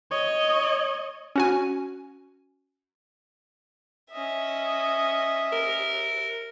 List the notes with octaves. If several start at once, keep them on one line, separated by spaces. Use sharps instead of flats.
C#5 D#5
C#4 F#4 G#5
C#4 D#5 E5
A#4